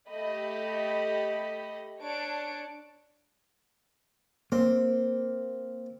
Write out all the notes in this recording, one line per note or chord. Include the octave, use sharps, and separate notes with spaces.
A3 G4 D#5 B5
D4 C#5 A5 D7
A#3 C4